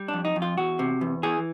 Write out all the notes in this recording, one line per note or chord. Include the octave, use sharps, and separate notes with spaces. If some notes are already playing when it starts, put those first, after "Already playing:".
Already playing: G3
F2 D4
D#4
F2
F4
E2 F#4
C3
E2
E3 G#4